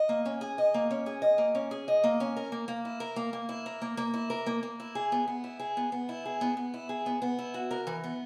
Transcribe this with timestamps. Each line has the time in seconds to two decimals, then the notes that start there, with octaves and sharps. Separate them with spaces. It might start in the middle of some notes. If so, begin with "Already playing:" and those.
Already playing: D#5
0.09 A#3
0.26 C#4
0.41 G#4
0.58 D#5
0.74 A#3
0.91 C#4
1.06 G#4
1.22 D#5
1.38 A#3
1.55 C#4
1.71 G#4
1.88 D#5
2.04 A#3
2.20 C#4
2.36 A#4
2.52 A#3
2.68 A#3
2.85 E4
3.00 A#4
3.16 A#3
3.33 A#3
3.49 E4
3.66 A#4
3.82 A#3
3.97 A#3
4.14 E4
4.30 A#4
4.46 A#3
4.63 A#3
4.80 E4
4.95 G#4
5.12 B3
5.28 B3
5.44 E4
5.59 G#4
5.77 B3
5.92 B3
6.09 E4
6.25 G#4
6.41 B3
6.57 B3
6.74 E4
6.89 G#4
7.06 B3
7.22 B3
7.39 E4
7.54 F#4
7.71 A#4
7.87 E3
8.04 B3